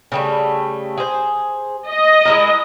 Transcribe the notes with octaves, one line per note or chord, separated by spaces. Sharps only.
C#3 G3 A3
G#4 C5
D#5
G#3 E4 A#4